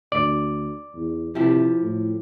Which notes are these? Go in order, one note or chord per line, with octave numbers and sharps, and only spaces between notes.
D2 D5
E2
C3 F3 E4 G4
A2